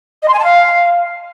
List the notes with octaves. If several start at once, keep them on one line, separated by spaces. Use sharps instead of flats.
D#5
C6
G#5
A5
F5